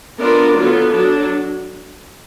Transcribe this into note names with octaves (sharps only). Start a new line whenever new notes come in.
B3 D4 F4 A#4 D5
D3 F#3 B3 F4
F#3 D4